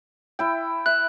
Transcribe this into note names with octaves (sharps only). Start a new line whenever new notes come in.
E4 G5
E5 F#6